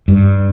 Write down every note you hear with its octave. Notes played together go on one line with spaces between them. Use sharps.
G2